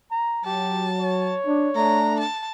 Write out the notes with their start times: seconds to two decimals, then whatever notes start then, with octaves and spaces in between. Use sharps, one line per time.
0.11 A#5
0.45 F#3 G4 A5
1.00 C#5
1.46 D4
1.76 A3 D4 A#5
2.19 A5